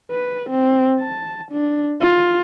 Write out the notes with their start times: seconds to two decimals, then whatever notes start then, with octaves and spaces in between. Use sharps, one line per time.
0.11 B4
0.50 C4
0.99 A5
1.52 D4
2.01 F4